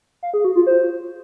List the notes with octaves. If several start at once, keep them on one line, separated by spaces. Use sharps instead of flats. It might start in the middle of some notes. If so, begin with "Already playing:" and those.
F5
G#4
F#4
F4
C5